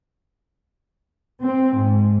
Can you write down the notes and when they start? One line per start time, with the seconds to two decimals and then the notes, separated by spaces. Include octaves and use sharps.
1.44 C4
1.75 G#2